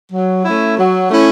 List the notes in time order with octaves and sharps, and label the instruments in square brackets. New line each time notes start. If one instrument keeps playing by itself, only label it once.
[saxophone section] F#3
A3 C#4 E4
F#3
A3 C#4 E4